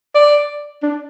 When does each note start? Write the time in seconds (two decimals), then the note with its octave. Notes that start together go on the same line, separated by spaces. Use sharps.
0.15 D5
0.83 D4